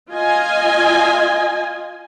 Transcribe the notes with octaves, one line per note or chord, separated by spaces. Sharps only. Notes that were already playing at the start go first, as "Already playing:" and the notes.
F4 D#5 G#5